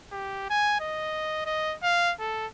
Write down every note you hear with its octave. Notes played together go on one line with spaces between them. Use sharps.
G4
G#5
D#5
D#5
F5
A4